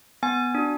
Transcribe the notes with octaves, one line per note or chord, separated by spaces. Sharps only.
B3 G#5
D4 F#4